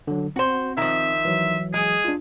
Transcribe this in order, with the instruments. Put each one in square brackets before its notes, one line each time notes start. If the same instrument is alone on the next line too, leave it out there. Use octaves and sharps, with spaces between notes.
[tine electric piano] D3 F#3
[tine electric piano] C4 [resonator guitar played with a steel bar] F#4 C5
[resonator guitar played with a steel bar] D#3 F3 [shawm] E5
[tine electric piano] E3 F#3
[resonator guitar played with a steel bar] G#3 [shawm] G#4
[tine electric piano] D4 F4